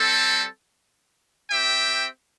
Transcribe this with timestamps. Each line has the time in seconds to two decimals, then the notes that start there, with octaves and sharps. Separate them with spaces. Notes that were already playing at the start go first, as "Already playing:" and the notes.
Already playing: G3 C4 A4
1.51 C4 G4 E5 G5